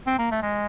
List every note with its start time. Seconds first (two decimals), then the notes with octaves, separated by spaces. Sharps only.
0.07 C4
0.18 A#3
0.31 A3
0.42 G#3